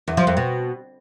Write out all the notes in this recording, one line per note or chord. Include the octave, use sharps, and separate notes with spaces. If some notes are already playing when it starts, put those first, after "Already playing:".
E2
F3
F2
B2